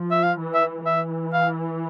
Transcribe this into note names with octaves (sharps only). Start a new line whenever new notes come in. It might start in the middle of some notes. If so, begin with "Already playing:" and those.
Already playing: F3
E5
F5
E3
E5
E3 E5
F5